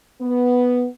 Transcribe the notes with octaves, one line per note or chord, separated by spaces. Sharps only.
B3